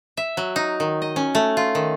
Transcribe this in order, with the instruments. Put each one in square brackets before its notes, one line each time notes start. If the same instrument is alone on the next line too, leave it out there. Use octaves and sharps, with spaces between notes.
[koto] E5
F#3
D#4
D#3
D#5
C#4
A3
F4
D#3